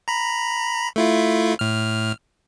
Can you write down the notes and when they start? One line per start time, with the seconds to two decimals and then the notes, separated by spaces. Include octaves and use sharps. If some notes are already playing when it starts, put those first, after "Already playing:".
0.08 A#5 B5
0.96 A3 E4 F4
1.59 A2 F6